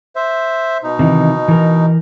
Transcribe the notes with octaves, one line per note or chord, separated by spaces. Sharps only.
C5 E5
B2 D#4
C3 D#3 E3
E3 A#4